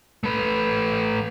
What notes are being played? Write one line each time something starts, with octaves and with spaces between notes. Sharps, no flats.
A3 B4